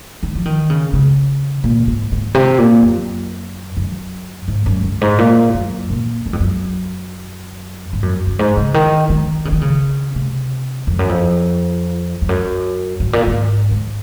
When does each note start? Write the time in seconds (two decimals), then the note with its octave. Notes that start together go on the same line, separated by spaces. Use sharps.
0.23 D#3
0.35 F3
0.46 D#3
0.70 C#3
0.93 C#3
1.64 A#2
1.87 G#2
2.12 G#2
2.35 C3
2.58 A#2
2.82 F#2
3.77 F#2
4.48 G#2
4.66 F#2
4.83 F#2
5.01 G#2
5.18 A#2
5.54 F#2
5.90 A#2
6.26 F#2
6.33 F2
6.40 F#2
7.93 G#2
8.03 F#2
8.27 F#2
8.39 G#2
8.57 C#3
8.74 D#3
9.10 D#3
9.45 C#3
9.52 D#3
9.61 C#3
10.16 C3
10.87 F2
10.99 F#2
11.09 F2
12.22 F2
12.29 F#2
13.00 G#2
13.13 A#2
13.27 G#2
13.71 G#2